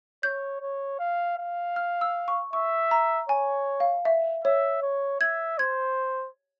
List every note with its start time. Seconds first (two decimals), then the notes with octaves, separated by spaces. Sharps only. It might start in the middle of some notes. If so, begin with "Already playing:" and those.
0.23 C#5 G6
0.61 C#5
0.99 F5
1.38 F5
1.76 F6
2.01 E6
2.28 C#6
2.53 E5 C#6
2.91 A#5
3.29 C#5 G#5
3.80 F5
4.05 E5
4.44 C#5 E5
4.82 C#5
5.21 E5 G#6
5.58 C5 G#6